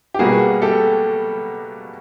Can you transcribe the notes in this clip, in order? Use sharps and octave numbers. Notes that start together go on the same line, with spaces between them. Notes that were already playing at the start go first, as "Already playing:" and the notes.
G4
B2 G3 A#3 F#4 G#4
G4 A4